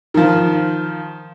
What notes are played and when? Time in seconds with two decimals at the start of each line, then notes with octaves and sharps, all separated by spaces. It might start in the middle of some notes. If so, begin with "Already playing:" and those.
0.14 D#3 F3